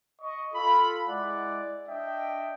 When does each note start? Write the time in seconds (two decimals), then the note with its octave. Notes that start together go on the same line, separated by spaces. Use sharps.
0.21 D#5 C#6
0.54 F4 A4 B5
1.08 G#3 E4 D5 F#5
1.88 D4 D#5 E5 G5